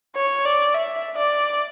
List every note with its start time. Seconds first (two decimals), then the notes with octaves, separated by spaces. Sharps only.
0.16 C#5
0.45 D5
0.74 E5
1.17 D5